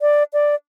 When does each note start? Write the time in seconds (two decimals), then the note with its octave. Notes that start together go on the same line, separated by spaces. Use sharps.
0.01 D5
0.33 D5